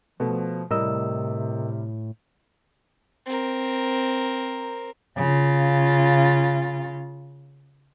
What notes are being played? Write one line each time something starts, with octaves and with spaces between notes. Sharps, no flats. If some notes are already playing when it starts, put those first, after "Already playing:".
B2 F3 A3
A2 C3 G3 A#4 D#5 E6
C4 A#4
C#3 F4